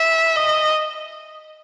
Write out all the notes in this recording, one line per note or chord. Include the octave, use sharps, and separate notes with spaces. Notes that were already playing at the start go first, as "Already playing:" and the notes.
Already playing: E5
D#5